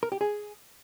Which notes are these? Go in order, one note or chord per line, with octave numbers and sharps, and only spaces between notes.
A#4
G4
G#4